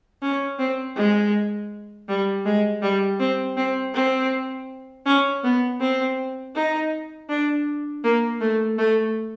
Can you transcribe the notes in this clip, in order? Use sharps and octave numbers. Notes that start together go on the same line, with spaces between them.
C#4
C4
G#3
G3
G#3
G3
C4
C4
C4
C#4
B3
C4
D#4
D4
A#3
A3
A3